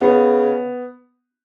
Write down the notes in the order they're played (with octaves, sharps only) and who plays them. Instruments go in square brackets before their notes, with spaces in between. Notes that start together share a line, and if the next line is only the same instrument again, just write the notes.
[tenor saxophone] C#3 [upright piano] B3